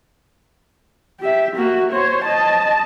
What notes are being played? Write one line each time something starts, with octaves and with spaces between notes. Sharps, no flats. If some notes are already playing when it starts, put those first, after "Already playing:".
G4 E5
A#3 F#4
C5 C#5
D#5 A5